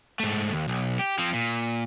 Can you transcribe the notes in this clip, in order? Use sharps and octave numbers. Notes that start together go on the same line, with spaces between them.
G#2 A3
D#2
B1
G4
F3 C4
A#2